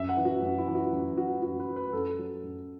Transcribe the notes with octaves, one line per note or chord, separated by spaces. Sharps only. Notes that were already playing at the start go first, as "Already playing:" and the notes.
Already playing: F#2 E5
F#5
E3
F#4
F#2
E4
E3
F#4
F#2
E3 F#4
F#2 F#4
B4
E3
B4
F#2 A4
F#3
F#2